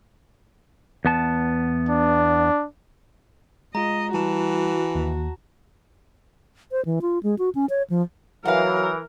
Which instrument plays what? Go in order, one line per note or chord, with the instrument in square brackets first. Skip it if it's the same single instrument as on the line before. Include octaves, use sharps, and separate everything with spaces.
[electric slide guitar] E2 B3 A5
[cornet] D4
[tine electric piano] G#3 F4 [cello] D#5 [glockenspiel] A#5
[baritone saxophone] E3 [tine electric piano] G3 [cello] F#4 [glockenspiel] A5 E7
[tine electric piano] D#2
[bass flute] C5
E3
F4
G#3
F#4
C#4
C#5
F3
[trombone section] E3 [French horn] F#3 [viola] A#4 [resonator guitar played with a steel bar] F5 F#5